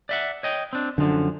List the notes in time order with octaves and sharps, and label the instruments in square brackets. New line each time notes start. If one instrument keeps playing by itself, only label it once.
[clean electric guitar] D5 E5 F#5
C#5 D#5 G5
C4 D4
[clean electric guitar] F#2 F3 [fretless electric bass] D3